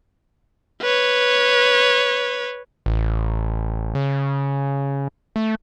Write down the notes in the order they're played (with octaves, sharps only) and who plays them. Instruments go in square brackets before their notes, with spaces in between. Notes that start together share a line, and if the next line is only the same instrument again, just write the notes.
[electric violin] B4 C#5
[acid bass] A1
C#3
A3